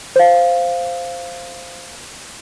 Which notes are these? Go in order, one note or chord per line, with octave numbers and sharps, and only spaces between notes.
C5 F5